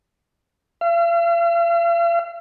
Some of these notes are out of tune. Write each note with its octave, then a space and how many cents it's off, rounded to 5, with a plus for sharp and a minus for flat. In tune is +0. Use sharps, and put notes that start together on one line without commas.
F5 -45